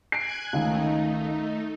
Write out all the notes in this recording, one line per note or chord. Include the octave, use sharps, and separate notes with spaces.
G#5 F#6 G#6 C7 D7
C#2 D#3 A3 D#4